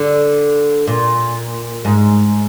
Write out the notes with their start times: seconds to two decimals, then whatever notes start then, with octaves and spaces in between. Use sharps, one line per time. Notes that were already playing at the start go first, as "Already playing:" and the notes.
Already playing: D3
0.87 A#2
1.85 G#2